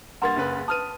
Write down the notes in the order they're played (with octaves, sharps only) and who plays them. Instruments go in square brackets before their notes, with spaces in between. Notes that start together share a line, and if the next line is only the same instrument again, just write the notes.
[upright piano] G2 A#3 A6 [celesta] F#5 A#5 C6
[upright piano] F#1 C#3 B4
[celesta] B4 A5 [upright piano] D#6 F6 D#7